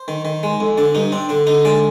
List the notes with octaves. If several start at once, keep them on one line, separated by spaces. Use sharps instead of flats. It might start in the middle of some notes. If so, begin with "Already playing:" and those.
Already playing: C5
D#3
D#3
G#3
F2
D3 D4
G2 D#4
C4 D4
D3 D4
D3 D#4
G#3 D5